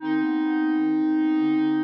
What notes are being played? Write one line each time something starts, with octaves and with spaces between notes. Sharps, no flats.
D#3 C4 D#4
B3
B3
B3
D#3
D#3
B3
D3
D3